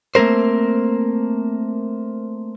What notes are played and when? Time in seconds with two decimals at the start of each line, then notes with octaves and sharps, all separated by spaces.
0.15 A3 A#3 C4 A#4 C5